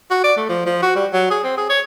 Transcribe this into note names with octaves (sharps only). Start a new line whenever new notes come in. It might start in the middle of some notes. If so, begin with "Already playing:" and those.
F#4
D5
A3
F3
F3
F#4
G3
F#3
G#4
C4
G#4
C#5